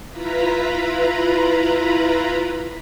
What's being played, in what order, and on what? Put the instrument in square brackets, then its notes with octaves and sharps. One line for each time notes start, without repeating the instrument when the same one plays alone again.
[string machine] E4 F4 B4 A#5 B5